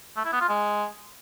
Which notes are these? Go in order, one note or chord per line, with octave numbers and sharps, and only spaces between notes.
A3
E4
B3
F4
G#3